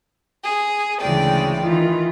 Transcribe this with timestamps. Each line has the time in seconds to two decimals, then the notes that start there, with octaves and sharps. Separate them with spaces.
0.43 G#4
1.00 D2 C#3 E3 G#3 D5 G5
1.62 D#3 E3 F4